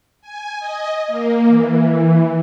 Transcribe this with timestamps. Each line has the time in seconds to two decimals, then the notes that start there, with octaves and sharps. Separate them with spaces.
0.22 G#5
0.60 D#5
1.08 A#3
1.47 E3